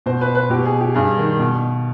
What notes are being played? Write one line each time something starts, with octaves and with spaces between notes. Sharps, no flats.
B2 C5
B4
B4
B2 G4
G#4
G4
G2 G#4
D#3
B2